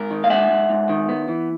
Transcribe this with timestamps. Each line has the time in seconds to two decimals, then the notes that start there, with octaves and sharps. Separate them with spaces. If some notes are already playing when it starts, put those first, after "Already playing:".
Already playing: G#2 A#4
0.10 D#3
0.24 F5
0.30 G#3 E5 F#5
0.50 G#2
0.69 G#2
0.89 D#3
1.09 B3
1.29 E3